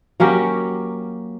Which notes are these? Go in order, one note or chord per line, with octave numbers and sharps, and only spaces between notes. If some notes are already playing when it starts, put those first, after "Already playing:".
F#3 A#3 C#4 G4